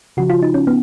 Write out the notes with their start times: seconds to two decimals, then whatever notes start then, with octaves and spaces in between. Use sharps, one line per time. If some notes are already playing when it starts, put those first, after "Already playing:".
0.17 C#3 F3 F#4
0.30 F4
0.43 D#4
0.54 C#4
0.67 B3